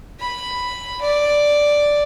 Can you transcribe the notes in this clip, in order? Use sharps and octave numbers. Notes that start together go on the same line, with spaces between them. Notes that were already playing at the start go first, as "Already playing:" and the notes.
B5
D5